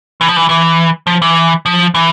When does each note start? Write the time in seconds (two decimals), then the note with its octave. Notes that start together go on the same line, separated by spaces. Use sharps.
0.21 E3
0.28 F3
0.36 E3
0.49 E3
1.07 F3
1.22 E3
1.66 F3
1.95 E3